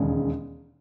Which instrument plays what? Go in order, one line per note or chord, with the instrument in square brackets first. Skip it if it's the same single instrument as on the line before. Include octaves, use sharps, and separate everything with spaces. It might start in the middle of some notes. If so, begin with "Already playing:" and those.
Already playing: [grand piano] E1 D#2 C#3 G#3